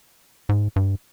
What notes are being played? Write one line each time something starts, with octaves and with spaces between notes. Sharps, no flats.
G#2
G2